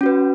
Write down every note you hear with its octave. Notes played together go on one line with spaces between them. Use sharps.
C#4 F#4 B4